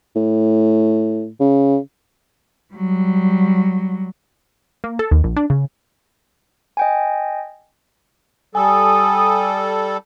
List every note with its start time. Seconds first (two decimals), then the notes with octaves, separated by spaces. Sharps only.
0.16 A2
1.40 C#3
2.74 F#3 G3
4.84 A#3
4.99 A4
5.11 D#2
5.24 A#1
5.36 D4
5.50 C#3
6.77 D#5 G5 G#5
8.55 G3 A4 G#5 D#6